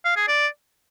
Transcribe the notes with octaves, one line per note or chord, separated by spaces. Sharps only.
F5
G#4
D5